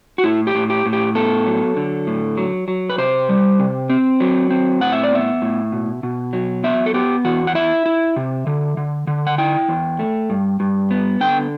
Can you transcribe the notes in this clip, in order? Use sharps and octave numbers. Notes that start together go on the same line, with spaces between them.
F#4
A2 E4
G4
A2
G4
A2
G4
B3 A4
F#3
D3
A2
F#3
F#3
B4
C3 C5
G3
C3
C4
F#3
C4
A2 F#5
E5
D5
B3 E5
A2
B2
B2
F#3
B3 E5
A4
B3 G4
E2 F#4
F#5
E4 E5
E4
C3
D3
D3
D3
F#5
E4 G5
E2
A3
G2
G2
B3
D3 G5